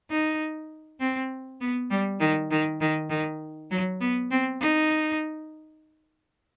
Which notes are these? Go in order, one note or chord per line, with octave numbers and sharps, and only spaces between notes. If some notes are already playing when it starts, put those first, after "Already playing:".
D#4
C4
B3
G3
D#3
D#3
D#3
D#3
F#3
B3
C4
D#4